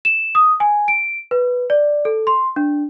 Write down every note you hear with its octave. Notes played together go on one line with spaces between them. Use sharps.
E7
D#6
G#5
D7
B4
D5
A4
C6
D4